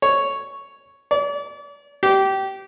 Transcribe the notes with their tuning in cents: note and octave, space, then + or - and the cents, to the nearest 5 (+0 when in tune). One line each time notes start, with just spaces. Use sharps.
C#5 +0
D5 -40
G4 -20